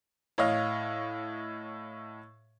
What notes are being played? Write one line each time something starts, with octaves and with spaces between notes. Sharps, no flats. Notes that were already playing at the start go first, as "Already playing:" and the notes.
A2 C#5 D#5 F5